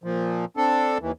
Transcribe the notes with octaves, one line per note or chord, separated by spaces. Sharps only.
A#2 F3
C4 D4 A4
D#2 E3